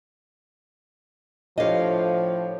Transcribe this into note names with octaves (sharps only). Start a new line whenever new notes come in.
A2 F3 D4 G4 C#5 D#5 F5